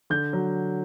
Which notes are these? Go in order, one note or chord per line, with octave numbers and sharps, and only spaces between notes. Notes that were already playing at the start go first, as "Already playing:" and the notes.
D3 G6
F#3